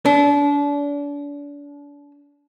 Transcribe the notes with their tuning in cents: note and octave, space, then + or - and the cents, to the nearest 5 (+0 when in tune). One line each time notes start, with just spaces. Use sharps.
D4 -35